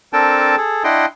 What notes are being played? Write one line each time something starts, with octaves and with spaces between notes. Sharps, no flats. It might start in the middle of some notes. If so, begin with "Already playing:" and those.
C4 D4 A4 A#4 G5 A5
G#4 A4
D4 E4 D#5 F#5 G5 C6